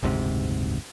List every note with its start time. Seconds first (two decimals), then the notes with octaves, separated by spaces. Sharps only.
0.03 F#1 D2 G#2 C3